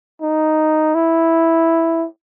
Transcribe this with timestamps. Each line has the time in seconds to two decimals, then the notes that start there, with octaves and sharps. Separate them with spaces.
0.22 D#4
0.95 E4